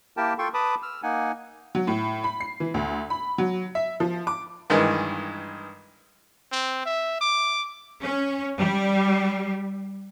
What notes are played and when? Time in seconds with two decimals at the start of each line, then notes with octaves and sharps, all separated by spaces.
0.17 A#3 E4 G4 A#4 G5 A5
0.38 F4 A4 G5 C6 C#6
0.54 B4 A5 B5 D6 D#6
0.83 E6 F6
1.03 A#3 D#4 F#5 G#5
1.75 F#3
1.87 A2
2.24 B5
2.41 C7
2.60 E3
2.74 D2
3.10 B5
3.38 F#3
3.75 E5
4.00 F3
4.27 D6
4.70 G2 D#3 E3 G#3
6.52 C4
6.85 E5
7.21 D6
8.01 C#4
8.59 G3